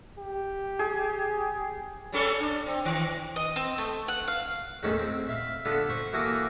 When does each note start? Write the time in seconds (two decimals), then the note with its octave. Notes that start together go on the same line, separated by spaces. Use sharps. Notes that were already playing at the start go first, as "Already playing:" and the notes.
0.19 G4
0.79 G#4
2.12 G3 C#4 A4
2.40 D4
2.66 C4
2.85 D#3 E3
3.36 D#5
3.56 C4
3.78 A3
4.08 F#5
4.28 F5
4.83 E2 A2 D#3 C#4 A4
4.99 C4
5.29 E5 F5 B5
5.65 D3 B3 F4 A4 B4
5.89 C5 B5 C#6
6.13 E3 A#3 F#4 A4 A#4 D#6